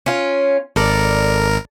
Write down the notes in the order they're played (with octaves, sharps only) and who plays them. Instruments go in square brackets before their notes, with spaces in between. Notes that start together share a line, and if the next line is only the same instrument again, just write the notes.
[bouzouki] C#4 F4
[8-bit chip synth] G#1 A#4 [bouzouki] A4 D5